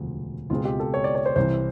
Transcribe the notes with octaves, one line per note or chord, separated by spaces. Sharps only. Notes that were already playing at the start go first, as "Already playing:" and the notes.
Already playing: E1 D2 C3 F3
C#2 B2 G#3 C4 F4
G4
A4
C#5
D5
C#5
C5
C2 C3 E3 C5